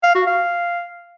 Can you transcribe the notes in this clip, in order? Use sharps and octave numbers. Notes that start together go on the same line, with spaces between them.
F5
F#4
F5